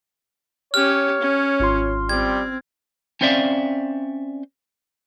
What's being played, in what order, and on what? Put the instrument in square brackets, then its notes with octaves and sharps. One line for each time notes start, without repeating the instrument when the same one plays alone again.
[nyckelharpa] C#4 G4 [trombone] C#5 [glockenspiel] F6
[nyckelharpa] C#4
[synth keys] G#1 F4 C6
[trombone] G3 [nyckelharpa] C4 [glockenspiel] G#6
[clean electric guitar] C4 C#4 C5 D5 E5 F5